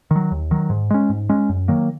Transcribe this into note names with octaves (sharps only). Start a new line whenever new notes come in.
D#3 F#3
D#2
D#3 F#3
G#2
G#3 C#4
G#2
G#3 C#4
F#2
D#3 F#3 A#3